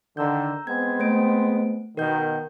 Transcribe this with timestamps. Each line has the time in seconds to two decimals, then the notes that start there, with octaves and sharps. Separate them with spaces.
0.17 D3 D#3 A#5 E6 G6
0.67 G#3 B3 C4 G#6
1.00 A3 C5 D7
1.97 B2 D#3 A#4 G6